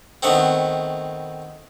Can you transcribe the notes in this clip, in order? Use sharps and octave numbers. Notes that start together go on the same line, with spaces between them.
D#3 A3 B3 C4